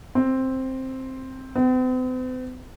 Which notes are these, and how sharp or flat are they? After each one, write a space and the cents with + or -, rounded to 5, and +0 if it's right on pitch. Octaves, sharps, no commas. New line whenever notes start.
C4 +5
C4 -45